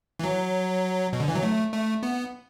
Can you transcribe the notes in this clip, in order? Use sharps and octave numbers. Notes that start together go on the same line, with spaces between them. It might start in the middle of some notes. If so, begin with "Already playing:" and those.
E3
F#3
B2
D3
E3
F#3
A3
A3
B3